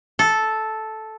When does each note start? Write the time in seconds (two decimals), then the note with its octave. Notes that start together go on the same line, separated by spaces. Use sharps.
0.19 A4